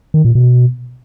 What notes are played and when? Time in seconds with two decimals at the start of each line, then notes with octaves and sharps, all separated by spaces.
0.14 D#3
0.25 A#2
0.35 B2